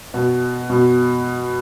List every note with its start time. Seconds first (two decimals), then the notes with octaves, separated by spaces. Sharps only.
0.14 B2
0.70 B2